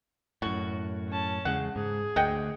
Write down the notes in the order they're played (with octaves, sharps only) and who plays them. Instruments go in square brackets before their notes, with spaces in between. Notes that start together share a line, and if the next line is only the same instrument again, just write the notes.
[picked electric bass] F#2 A2 [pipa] F#4
[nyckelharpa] C#4 A5
[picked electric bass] E2 C#3 G#3 [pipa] F#5
[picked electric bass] G#2 [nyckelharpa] G#4
[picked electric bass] D2 [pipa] D#5 F#5 G5